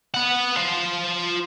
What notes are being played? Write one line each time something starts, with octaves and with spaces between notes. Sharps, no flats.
B3 F#5
F4 C5